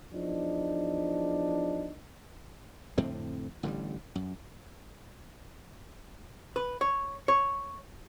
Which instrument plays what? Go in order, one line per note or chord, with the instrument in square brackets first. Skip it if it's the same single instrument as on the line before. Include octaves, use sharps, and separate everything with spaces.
[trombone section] E2 F3 D4 D#4
[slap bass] F2 A2 D3 C4
A1 D3 E3 G3
F#2
[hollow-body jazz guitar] B4
C#5
C#5